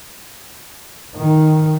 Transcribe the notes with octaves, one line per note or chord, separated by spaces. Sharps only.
D#3